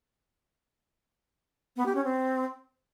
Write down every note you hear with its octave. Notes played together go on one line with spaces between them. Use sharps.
B3
G4
C#4
C4